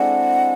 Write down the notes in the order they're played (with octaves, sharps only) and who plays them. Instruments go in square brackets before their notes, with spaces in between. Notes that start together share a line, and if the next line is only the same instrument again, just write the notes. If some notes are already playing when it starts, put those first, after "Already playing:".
Already playing: [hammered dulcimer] G#3 C4 D4 E4 A4 [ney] F#5